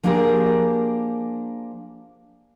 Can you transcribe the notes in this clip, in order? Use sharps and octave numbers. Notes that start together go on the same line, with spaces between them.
F3 A#3 D4 G4 G#4 A#4